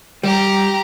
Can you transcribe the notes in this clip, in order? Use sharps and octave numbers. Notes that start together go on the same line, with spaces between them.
G3 G4 A#5